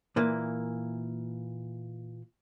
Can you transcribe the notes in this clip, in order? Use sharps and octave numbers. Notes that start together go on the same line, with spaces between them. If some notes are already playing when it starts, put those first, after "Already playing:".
A#2 E3 A#3